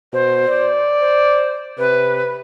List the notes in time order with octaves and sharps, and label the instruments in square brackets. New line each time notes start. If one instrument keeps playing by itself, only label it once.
[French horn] B2 [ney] C5
[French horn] D5
[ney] C5
[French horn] C3 [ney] B4